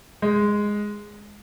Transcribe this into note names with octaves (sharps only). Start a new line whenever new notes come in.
G#3